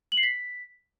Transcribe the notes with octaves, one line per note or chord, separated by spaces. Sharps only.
F#7
C7
B6